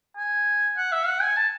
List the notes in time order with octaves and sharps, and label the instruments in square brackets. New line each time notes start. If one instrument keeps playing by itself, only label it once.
[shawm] G#5
F#5
E5
F#5
G#5
A5